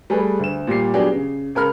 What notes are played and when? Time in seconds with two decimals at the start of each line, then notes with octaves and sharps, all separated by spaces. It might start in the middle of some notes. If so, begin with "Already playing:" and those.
0.10 G3 A3 G#4 B4
0.40 D2 E7
0.67 A#2 G3 G4 C7
0.94 F#3 B3 D4 G4 G#4 D5
1.12 C#3
1.55 C#2 A#4 B5 F6